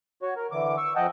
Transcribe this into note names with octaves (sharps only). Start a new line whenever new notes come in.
F#4 C#5
A#4
D3 E3 D6
C#6 E6
F2 D#5 F#5 G5 A5